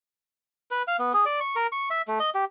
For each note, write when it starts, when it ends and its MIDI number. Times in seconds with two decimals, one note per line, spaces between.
0.71 0.83 71
0.88 0.97 77
0.99 1.12 59
1.13 1.24 68
1.26 1.40 74
1.40 1.56 85
1.56 1.67 70
1.72 1.89 85
1.90 2.02 76
2.08 2.19 57
2.20 2.30 75
2.35 2.45 67